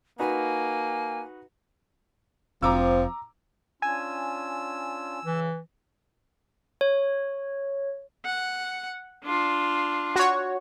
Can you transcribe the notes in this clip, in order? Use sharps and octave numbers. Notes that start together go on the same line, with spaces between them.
A#3 D#4 F#4 B4 G#5
F1 F3 C4 A#5 D6 E6
C#4 D4 F4 G#5 E6
C#3 E3
C#5
F#5
D4 F4
F#4 C#5